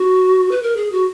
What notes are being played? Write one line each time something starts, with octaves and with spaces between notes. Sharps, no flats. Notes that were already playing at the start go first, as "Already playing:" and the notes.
Already playing: F#4
B4
A#4
G#4
F#4